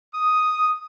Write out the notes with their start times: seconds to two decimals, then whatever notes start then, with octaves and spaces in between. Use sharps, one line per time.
0.15 D#6